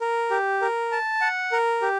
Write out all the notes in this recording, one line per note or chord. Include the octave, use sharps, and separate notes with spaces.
A#4
G4
A#4
A5
F#5
A#4
G4